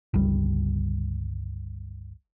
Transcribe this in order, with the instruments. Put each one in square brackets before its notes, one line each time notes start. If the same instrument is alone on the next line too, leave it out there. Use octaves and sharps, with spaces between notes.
[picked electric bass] G1 C#2 G3